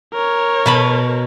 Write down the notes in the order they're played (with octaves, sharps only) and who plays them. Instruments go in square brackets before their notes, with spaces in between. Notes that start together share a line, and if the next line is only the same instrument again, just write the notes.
[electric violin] A#4 C#5
[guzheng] B2 A5 B5